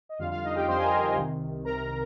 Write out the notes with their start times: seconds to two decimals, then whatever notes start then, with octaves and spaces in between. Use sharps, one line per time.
0.09 D#5
0.19 F2 D3 G3 F4 F5
0.31 F4 F5
0.44 D#4 D#5
0.56 G4 G5
0.68 F2 D3 G3 C5 C6
0.78 G#5
0.84 A#4 A#5
1.16 C2 C3 D#3
1.64 C2 C3 D#3 A#4 A#5